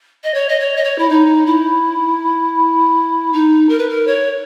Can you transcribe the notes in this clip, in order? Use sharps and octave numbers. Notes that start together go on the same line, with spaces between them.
D#5
C#5
D#5
C#5
D#5
C#5
E4
D#4
E4
D#4
A#4
B4
A#4
C#5